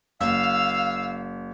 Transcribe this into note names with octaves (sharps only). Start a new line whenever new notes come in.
F#1 F5 E6